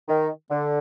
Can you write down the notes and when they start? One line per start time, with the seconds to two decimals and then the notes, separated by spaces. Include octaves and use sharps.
0.09 D#3
0.51 D3